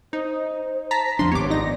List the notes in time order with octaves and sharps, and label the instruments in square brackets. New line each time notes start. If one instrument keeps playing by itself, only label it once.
[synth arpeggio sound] D#4 [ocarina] C5
[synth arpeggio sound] A5 A#5 B6
[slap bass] E2 F3 D4 [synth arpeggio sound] C6
[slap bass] G#1 B3 [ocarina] G4 [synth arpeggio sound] C#5 D6
[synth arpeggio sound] D#4 A#6 [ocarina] D5